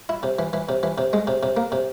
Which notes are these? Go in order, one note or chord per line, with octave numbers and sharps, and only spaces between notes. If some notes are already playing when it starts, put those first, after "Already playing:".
E4
C3
E3
E3
C3
E3
C3
G#3
C3
C3
A#3
C3